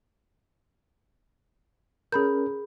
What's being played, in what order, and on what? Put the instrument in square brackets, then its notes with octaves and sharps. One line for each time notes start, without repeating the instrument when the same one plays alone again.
[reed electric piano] C#4 A#4 [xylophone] G#4 B5 G6